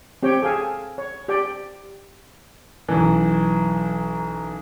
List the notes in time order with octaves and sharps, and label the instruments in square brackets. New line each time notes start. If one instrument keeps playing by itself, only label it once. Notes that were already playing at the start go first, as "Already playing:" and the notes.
[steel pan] C4 G4 C#5 G5
G#4 A4 F5 G#5
C#5
G4 D5 G5
[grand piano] B1 F#2 E3